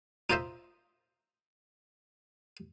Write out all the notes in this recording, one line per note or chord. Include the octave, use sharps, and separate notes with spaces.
D#4 F4 C5 D#5 E5